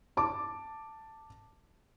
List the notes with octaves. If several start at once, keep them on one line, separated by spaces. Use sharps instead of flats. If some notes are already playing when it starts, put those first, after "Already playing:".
A5 D6